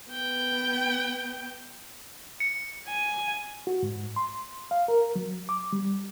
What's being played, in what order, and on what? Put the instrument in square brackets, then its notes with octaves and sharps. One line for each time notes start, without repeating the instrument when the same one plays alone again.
[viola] B3 G5
[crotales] C#7
[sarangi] G#5
[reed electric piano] F#4
G#2
C6
F5
A#4
F#3
D6
G3